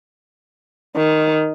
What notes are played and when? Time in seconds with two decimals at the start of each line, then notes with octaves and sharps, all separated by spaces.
0.96 D#3